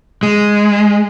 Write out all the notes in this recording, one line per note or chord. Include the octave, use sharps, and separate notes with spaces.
G#3